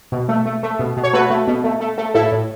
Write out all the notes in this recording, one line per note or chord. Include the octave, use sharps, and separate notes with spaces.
B2
A3
A3
A3
B2
B2
C#5
A3 F#4 B4
A3
B2
A3
A3
A3
A2 E4 A4
A2